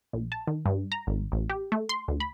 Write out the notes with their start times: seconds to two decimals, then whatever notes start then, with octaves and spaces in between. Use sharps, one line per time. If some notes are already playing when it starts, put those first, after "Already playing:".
0.13 A#1
0.32 A5
0.47 D#3
0.66 G2
0.92 A#5
1.07 G#1
1.32 A1
1.50 G4
1.72 A3
1.89 C6
2.08 D2
2.20 B5